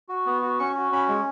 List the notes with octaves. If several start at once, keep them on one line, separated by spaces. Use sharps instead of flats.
F#4
B3
F#4
C#4 C#6
F#4
C#4 B5
G#3